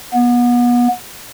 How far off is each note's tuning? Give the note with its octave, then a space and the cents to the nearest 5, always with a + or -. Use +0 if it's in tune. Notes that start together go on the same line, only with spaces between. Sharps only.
B3 -30